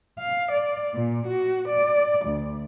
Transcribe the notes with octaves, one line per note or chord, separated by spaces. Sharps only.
F5
D5
A#2
F#4
D5
D2